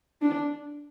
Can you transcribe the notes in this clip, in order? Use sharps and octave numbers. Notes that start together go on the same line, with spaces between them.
D4